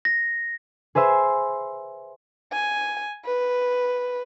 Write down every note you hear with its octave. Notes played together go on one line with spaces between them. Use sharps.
A#6
G#4 B4 C5 E5
G#5
B4